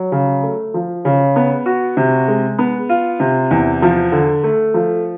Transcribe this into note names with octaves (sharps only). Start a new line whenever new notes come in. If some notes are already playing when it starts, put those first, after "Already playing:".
Already playing: F#3
C#3
A3
F3
C#3
B3
F#4
C3
G#3
B3
F4
C3
E2
F3
D3
A3
F3